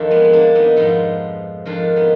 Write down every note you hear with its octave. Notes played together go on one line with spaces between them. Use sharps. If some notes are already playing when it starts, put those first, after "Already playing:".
Already playing: F2 D#3 D4 F4
G#3 B3
B3
A#3 D4
B3 D#4
G#2 F3 B3 D#4
F2 D#3 D4 F4
B3 D#4